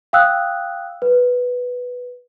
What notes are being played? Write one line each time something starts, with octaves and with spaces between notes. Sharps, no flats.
F5 G5 D#6 E6 F#6
B4